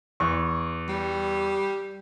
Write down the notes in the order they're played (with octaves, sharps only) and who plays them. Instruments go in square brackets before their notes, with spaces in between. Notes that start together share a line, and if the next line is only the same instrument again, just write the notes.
[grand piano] E2 C#6
[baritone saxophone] G3